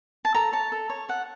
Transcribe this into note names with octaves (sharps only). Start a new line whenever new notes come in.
A5
A4 A#5
C#5 A5
A4
C#5
A4 F#5